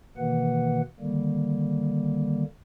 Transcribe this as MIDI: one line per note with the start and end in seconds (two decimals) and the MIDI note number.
0.17 0.81 47
0.17 0.81 51
0.17 0.81 52
0.17 0.81 58
0.17 0.81 71
0.17 0.81 78
1.00 2.43 50
1.00 2.43 51
1.00 2.43 55
1.00 2.43 58